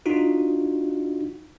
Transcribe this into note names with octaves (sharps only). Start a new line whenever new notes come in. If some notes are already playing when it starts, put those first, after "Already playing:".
D4 D#4 F4 F#4